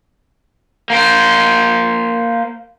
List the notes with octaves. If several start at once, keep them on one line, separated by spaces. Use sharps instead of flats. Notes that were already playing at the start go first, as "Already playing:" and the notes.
A#3 C5